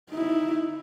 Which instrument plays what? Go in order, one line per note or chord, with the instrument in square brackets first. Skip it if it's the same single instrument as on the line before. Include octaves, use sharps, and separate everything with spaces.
[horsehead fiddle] D#4 E4